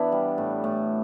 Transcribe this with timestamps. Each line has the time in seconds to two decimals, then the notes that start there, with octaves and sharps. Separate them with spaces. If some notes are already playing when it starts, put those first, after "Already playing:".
Already playing: E3 B3 D4 E4
0.12 G3
0.38 A2
0.64 A2